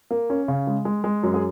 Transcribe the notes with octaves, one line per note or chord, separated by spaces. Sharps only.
A#3
C#4
C#3
G#3
G#3
G#3
F#2
G#4